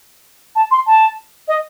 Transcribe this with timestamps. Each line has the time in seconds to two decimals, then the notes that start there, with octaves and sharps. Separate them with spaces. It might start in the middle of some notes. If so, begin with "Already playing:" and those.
0.56 A5
0.71 C6
0.87 A5
1.48 D#5